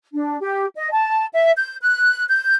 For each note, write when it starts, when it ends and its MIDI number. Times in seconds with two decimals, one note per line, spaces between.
0.13 0.36 62
0.40 0.66 67
0.76 0.90 75
0.92 1.26 81
1.33 1.51 76
1.56 1.75 91
1.81 2.25 90
2.29 2.54 91